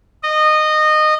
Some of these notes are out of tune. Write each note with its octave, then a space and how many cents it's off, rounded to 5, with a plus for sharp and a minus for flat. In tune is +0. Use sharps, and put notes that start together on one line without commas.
D#5 -20